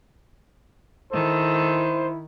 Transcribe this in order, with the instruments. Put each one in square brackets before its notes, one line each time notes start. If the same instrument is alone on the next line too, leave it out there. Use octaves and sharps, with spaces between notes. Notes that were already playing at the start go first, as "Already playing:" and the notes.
[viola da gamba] D#3 [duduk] E4 [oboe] A4 [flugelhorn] C5